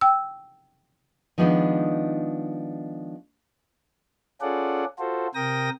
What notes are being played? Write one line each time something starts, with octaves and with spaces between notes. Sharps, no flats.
G5 E6
D#3 F3 G#3 B3 D4 D#4
C#4 F4 G#4 A4 D5 F#5
F4 F#4 A4 C5
C3 A#4 G5 D#6 A#6